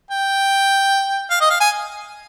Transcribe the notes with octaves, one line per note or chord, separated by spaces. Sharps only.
G5
F5
D#5
F5
G#5